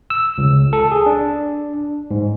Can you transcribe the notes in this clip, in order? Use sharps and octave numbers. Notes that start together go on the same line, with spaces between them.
E6
C#2
A4
G#4
D4
G#2